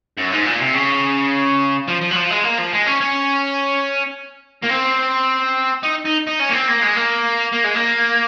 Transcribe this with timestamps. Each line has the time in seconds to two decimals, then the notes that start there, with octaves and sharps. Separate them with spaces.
0.18 F#2
0.32 G#2
0.46 A#2
0.61 C3
0.75 C#3
1.88 F3
2.01 F3
2.11 F#3
2.15 F3
2.30 G#3
2.44 A#3
2.58 F3
2.72 G#3
2.86 C#4
3.00 C#4
4.64 A#3
4.71 C4
5.83 D#4
6.05 D#4
6.27 D#4
6.40 C#4
6.50 A#3
6.54 C4
6.68 A#3
6.82 G#3
6.97 A#3
7.53 A#3
7.64 G#3
7.75 A#3